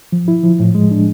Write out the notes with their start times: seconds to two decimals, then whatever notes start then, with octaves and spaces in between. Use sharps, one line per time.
0.12 F3
0.28 E4
0.43 F3
0.60 A2
0.75 G#3
0.91 D4